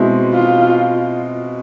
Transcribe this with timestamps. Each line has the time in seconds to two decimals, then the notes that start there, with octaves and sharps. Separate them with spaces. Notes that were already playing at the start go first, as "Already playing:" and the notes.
Already playing: B2 G#3 C4 E4
0.34 F4